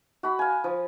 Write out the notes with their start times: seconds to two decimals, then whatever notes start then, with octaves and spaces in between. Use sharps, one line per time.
0.23 F#4 B5
0.39 F5 G#5
0.64 F3